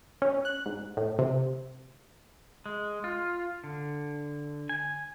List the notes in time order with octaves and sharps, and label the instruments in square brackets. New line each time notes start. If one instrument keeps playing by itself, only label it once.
[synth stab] C#4
F#6
G#2
A2
C3
[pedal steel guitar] G#3
F4
D3
G#5